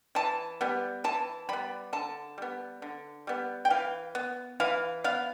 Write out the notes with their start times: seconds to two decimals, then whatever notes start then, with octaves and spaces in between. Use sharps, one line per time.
0.15 E3 A5
0.61 G3 B3
1.04 E3 A5
1.49 G3 B3 B5
1.93 D3 A5
2.38 G3 B3
2.82 D3
3.27 G3 B3
3.65 G5
3.70 E3 F5
4.15 B3
4.60 E3 F5
5.04 B3 F5